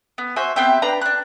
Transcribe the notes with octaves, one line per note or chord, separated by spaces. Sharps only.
B3
F#4 C5 E5 G#5
B3 C4 G4 E5
D4 B4 G5 A#5
D4 F#6